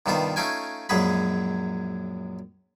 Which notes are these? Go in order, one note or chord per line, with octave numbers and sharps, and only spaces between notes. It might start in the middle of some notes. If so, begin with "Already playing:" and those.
G2 C3 D#3 B3 F4 C5
A3 C#4 D#4 F4 G5 G#5
A#1 F#2 F#3 G#3 G#4 B5